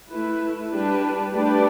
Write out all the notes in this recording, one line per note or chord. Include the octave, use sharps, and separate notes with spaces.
A3 E4 B4
G3 D4 G4 B4
A3 D4 G4 B4 D5